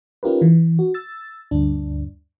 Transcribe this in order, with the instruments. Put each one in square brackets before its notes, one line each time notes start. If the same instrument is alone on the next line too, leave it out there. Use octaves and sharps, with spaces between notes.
[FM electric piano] C#4 D#4 F4 G4 A#4 B4
E3
F#4
E6 A6
D2 G2 D4